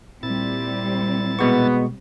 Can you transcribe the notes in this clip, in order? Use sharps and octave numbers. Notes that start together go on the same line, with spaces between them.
A#2 G3 C4 E4 A6
B2 G#3 B3 C#6